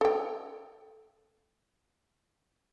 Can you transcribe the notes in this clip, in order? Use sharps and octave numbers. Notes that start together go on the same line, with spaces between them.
A4 G5